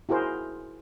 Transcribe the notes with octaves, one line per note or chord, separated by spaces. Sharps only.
E4 F#4 G#4 A#4 C5